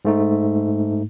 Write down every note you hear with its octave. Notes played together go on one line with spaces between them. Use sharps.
G#2 A3 D#4